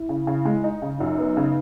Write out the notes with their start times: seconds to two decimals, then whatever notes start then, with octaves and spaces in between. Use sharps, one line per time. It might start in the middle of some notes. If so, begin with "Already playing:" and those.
Already playing: E4
0.09 C#3
0.27 C#3
0.45 G#3
0.64 D#4
0.82 C#3
1.00 F#2 D#4
1.19 B3
1.37 C#3